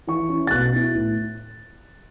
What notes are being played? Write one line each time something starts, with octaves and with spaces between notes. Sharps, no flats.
E3 C#6
C#4 E4
A6
B2 F#6
B3 E4
A2